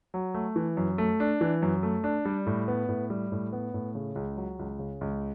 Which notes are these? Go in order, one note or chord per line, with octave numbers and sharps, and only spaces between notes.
F#3
A3
E3
F#2
A3
D4
E3
F#2
A3
D4
G3
A2
B3
A2
G3
A2
B3
A2
C#3
C#2
F#3
C#2
C#3
C#2